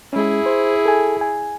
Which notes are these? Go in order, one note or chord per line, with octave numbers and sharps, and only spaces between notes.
G#3 C#4 E4 G#4
C5
A4 G#5
G#5